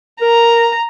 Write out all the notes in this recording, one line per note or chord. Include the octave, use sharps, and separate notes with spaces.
A#4 A#5